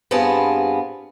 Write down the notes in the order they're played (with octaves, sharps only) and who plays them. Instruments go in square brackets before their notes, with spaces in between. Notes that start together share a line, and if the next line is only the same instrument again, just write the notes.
[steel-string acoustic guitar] G2 B3 C4 F4 G#4 A5